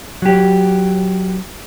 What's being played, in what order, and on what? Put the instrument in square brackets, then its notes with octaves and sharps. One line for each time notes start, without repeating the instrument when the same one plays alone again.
[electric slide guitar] F#3 G4